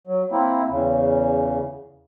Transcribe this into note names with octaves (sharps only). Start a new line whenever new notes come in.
F#3
A#3 C4 E4
E2 C#3